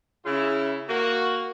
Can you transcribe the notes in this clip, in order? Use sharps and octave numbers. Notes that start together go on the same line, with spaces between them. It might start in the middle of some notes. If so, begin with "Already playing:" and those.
C#3 E4
A#3 F#4